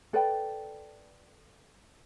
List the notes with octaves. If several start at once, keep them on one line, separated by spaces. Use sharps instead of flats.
A4 B4 D5 G5